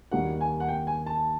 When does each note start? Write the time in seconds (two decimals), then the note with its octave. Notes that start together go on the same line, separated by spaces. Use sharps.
0.12 D#2 D#3 G3 A#3 F#5
0.41 G#5
0.60 F#5
0.68 G5
0.87 G#5
1.06 A5